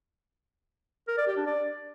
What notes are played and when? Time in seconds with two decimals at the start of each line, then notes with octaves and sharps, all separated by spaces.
1.08 A#4
1.17 D5
1.27 G4
1.37 D4
1.46 D5